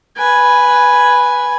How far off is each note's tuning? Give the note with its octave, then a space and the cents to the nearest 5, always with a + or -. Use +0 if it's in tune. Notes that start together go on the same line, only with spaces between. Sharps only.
B4 -5 G#5 +0